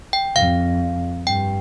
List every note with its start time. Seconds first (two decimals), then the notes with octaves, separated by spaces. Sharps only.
0.13 G5
0.36 F2 F5
1.27 G2 G5